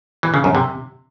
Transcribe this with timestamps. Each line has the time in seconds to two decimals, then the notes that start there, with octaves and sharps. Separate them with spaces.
0.23 E3
0.34 C#3
0.44 F#2
0.55 C3